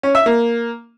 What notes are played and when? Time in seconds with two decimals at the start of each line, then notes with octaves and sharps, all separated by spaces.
0.03 C#4
0.15 E5
0.26 A#3